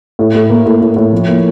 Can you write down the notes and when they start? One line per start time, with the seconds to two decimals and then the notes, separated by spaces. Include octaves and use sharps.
0.19 A2
0.35 A2
0.50 A#3
0.66 A2
0.82 A2
0.96 A2
1.12 F3
1.28 A#3